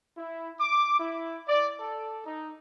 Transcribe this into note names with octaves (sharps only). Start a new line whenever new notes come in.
E4
D6
E4
D5
A4
D#4